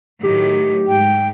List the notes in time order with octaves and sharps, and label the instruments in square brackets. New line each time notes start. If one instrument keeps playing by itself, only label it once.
[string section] A2 D#3 F#3 [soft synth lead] G4
[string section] G#2 [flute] G5